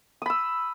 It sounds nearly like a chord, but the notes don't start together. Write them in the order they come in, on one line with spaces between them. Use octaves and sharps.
D#6 B5 E6